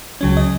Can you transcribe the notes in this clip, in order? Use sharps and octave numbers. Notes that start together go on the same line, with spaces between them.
C#2 C#3 F#3 C#4
D#5